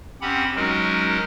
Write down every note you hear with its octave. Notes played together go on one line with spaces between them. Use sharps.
F2 C4 C#4 G4 F#5 B5
F#3 G#3 C#4 D#4 F#4 A#4